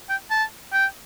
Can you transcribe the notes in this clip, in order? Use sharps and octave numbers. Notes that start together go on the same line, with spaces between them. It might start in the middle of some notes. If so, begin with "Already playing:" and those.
G5
A5
G5